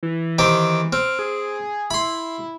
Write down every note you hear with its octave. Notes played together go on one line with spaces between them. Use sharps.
E3
D#3 C4 G4
C4 F6
G#4
E4 B5 C6